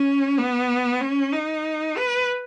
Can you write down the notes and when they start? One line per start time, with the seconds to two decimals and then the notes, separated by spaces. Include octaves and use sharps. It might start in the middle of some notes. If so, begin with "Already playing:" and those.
Already playing: C#4
0.38 B3
1.01 C#4
1.33 D#4
1.97 B4